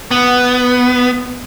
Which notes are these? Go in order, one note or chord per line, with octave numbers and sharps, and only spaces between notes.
B3